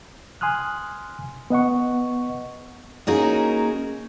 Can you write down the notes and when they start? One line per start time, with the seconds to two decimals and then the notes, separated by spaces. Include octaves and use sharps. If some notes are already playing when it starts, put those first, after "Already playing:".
0.41 G#5 C6 D#6 F6 F#6
1.50 B3 D#5 F#5 C#6
3.07 A#3 C#4 D#4 F#4 G#4 A#4